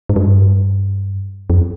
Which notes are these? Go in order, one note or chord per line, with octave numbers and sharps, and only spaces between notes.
G#2
G2
F2